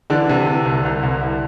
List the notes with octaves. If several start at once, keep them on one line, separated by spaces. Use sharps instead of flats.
D3 E3 D4
C3
C3
C2
C2
C2
C2